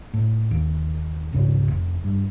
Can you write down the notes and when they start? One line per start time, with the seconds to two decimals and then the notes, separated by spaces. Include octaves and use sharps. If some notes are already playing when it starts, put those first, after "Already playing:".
0.14 A2
0.51 D#2
1.33 E1 C2 G#2 C#3
1.68 F1
2.04 G2